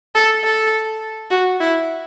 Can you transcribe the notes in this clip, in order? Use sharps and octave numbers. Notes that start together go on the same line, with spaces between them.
A4
A4
F#4
E4